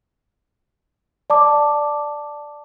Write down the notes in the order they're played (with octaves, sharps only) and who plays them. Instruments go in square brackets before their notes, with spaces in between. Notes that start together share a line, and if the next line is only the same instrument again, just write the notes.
[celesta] D5 A5 D6